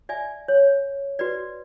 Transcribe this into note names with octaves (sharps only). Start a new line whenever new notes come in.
D5 E5 G#5
C#5
F#4 B4 D5